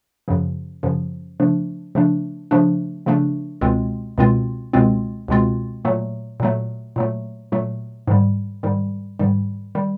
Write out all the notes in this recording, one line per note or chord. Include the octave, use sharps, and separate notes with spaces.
F#2 C#3 F3
F#2 C#3 F3
C#3 F3 A3 D4
C#3 F3 A3 D4
C#3 F3 A3 D4
C#3 F3 A3 D4
C#2 B2 G#3 C4 F4
C#2 B2 G#3 C4 F4
C#2 B2 G#3 C4 F4
C#2 B2 G#3 C4 F4
A#2 F#3 A3
A#2 F#3 A3
A#2 F#3 A3
A#2 F#3 A3
G#2 D#3 G3
G#2 D#3 G3
G#2 D#3 G3
D#3 G3